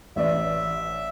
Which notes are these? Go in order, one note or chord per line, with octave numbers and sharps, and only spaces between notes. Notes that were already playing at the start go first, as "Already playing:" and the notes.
A1 D5 E5